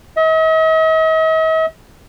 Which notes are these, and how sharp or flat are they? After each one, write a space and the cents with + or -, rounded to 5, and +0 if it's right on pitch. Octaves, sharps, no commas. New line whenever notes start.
D#5 +45